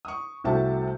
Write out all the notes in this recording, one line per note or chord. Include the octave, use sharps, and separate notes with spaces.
C#6 D#6
C2 C3 A3 F#4 G5 A5